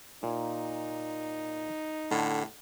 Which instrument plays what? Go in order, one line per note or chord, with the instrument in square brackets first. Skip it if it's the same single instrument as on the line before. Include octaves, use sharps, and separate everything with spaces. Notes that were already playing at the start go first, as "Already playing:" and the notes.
[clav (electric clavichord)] A#2 [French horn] D#4
[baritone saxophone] A2 [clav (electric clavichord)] D3